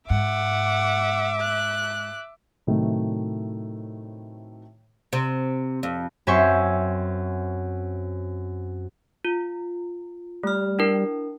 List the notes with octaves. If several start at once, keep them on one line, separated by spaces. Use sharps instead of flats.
G#2 E5 F#5 D6
F#6
A2 C3 D#3 F#3 A3
C3
F2
F#2 C4 C5 E5 G#5 C#6
F4
G3 A3 F6
D4 E4 A#4